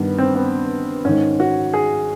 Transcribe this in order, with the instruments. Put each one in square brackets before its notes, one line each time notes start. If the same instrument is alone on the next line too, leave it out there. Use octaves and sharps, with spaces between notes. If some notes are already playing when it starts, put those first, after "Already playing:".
Already playing: [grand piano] G2 D#3 B3
C4
B3
G#2 D#3 C#4
F#4
G#4